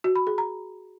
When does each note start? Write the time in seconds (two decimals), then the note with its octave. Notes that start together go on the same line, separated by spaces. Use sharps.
0.04 F#4
0.16 B5
0.27 G#4
0.38 A#5